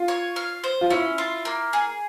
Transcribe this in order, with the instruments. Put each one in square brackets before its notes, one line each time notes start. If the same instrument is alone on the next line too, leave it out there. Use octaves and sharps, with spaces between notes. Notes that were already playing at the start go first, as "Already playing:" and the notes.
Already playing: [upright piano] F4
[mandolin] C#5
F5
C5
[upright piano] F4
[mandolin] C#4 [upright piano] E4
[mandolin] F4
A#3
G#4